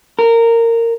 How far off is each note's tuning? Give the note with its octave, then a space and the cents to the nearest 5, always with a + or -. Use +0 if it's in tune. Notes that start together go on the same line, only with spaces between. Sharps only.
A#4 -15